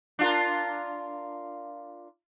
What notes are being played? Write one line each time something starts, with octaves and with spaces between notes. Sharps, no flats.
D4 F4 A#4